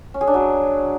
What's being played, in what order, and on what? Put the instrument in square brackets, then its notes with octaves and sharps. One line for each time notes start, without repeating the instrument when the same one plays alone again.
[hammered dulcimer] C#4
G#4
D4
F#3